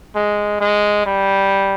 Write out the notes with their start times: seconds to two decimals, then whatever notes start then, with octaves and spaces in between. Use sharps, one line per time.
0.16 G#3
0.61 G#3
1.06 G3